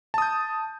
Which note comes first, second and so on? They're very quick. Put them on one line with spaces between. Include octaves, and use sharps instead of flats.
A5 D#6 G6